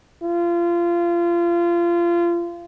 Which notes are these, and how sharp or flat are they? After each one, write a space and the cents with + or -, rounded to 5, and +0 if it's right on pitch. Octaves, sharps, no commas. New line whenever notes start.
F4 -25